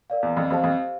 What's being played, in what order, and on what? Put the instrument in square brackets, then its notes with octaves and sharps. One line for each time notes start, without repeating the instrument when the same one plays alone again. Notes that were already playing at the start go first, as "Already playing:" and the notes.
[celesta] A#4 D5 F5
[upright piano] E2
F2
[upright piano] F2 [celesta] G4 C5 F5 A5
[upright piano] F2